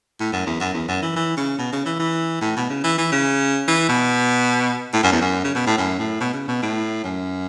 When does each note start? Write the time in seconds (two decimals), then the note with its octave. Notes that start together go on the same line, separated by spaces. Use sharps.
0.20 A2
0.32 F#2
0.46 E2
0.60 F#2
0.74 E2
0.88 F#2
1.02 E3
1.16 E3
1.37 C#3
1.58 B2
1.72 C#3
1.85 E3
1.99 E3
2.41 A2
2.57 B2
2.69 C#3
2.84 E3
2.98 E3
3.12 C#3
3.68 E3
3.89 B2
4.93 A2
5.03 F#2
5.12 E2
5.21 F#2
5.44 C#3
5.55 B2
5.66 A2
5.78 F#2
5.99 A2
6.20 B2
6.33 C#3
6.48 B2
6.62 A2
7.04 F#2